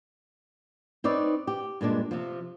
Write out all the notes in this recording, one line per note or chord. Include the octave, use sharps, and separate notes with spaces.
C4 D#4 B4 C#5 D5
G4
G2 A#2 G#3 D4
C3 F3